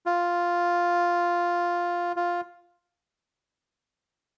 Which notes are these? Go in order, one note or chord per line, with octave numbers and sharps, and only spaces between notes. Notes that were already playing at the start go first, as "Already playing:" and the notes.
F4
F4